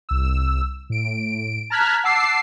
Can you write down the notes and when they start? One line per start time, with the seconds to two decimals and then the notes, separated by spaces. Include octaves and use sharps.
0.09 C2 E6
0.90 A2 D7
1.70 A5 A#5 F6 F#6 G#6 B6
2.04 F#5 A5 D6 E6 C7